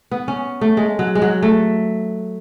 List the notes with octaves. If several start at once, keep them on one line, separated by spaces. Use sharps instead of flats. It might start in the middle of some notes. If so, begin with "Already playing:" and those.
B3
C#4
A3
G#3
F#3
G#3
F#3
A3